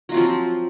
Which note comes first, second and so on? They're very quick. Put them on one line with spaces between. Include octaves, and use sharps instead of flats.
F#3 F4 C4 F3